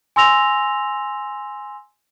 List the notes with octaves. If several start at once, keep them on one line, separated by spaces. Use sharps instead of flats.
G#5 C6 E6 A#6 F7